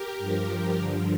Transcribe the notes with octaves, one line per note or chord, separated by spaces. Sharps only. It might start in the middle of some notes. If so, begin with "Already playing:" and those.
Already playing: G4 A#4
G2 F3
G2 D3 F3